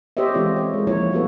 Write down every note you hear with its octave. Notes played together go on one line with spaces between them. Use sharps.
G4 C5 C#5 D#5 E5
E3 G#3 C4 F4 A4 D5
C#5
G#3 A#4
F3 A#3 D#4 E4 C#5
G3 B3 F4 F#4 A4 B4